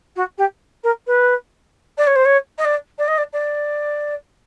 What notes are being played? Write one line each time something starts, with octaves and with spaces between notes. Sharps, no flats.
F#4
G4
A#4
B4
D5
C#5
C5
C#5
D#5
D5
D5
D#5
D5
D5